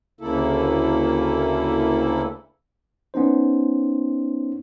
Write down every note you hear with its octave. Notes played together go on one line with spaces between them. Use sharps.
D2 C#3 A#3 E4 A4
B3 C#4 D#4 C5